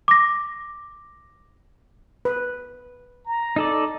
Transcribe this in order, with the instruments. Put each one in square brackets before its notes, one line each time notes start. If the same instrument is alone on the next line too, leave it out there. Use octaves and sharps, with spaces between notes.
[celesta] D6 A#6
[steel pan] B4
[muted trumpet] A#5
[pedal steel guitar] D#4 A4 D5